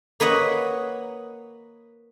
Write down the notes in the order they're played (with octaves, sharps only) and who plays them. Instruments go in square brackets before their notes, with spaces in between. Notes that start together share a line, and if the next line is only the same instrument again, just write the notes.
[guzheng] A#3 B4 C#5 D#5 F#5